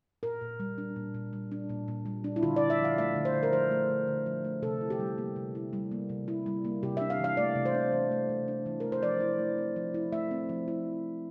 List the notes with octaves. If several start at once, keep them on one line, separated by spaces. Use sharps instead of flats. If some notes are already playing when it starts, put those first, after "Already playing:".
A#2 A#4
A#2
G3
D4
A#2
A#2
G3
D4
A#2
A#2
G3
D4
E4
D3 F4
D5
D3
E5
F3 F5
A3 E5
D3
C5
D3
A#4
F3 C5
A3
D3
D3
F3
A3
C3 A4
E4
G4
G3
A#3
C3
E4
G3
A#3
C3
E4
G3
A#3
C3 G4
D4 E5
F5
E3
F5
A3 D5
C3
C5
D4
E3
A3
C3
D4
E3
A3 A#4
C5
F3 D5
E4
A3
C4
F3
E4
A3 E5
C4
F3
E4